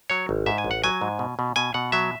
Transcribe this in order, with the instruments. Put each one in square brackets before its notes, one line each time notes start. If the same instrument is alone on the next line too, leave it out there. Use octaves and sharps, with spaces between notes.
[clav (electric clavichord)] F#3 C#5
G#1
G#2 E5
G#5
A1
F#5
F#3 G#5
G#2
B2
B2
B2 G#5
B2 F#5
F#3 E5